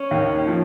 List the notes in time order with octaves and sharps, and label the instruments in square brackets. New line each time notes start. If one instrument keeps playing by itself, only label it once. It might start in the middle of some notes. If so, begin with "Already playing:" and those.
Already playing: [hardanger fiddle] C#4
[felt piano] D#2 D#3
F3